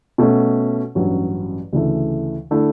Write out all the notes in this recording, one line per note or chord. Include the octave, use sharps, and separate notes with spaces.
B2 A3 C#4
A1 G2 F#3 C#4
D2 C#3 E3 A3
D3 A3 E4